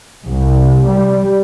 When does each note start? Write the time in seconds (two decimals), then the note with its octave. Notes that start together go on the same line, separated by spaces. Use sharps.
0.25 C2
0.86 G3